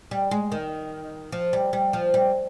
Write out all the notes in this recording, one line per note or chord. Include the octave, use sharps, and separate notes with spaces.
G3
G#3
D#3
F3
G3
G3
F3
G3